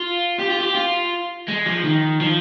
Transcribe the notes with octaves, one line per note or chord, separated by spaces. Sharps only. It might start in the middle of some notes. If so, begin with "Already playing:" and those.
Already playing: F4
G4
F4
G4
F4
G#3
F3
D#3
F3